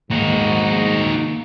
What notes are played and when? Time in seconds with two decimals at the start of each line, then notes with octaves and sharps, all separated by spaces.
0.11 G#2 D#3 A#3 D#4 F#4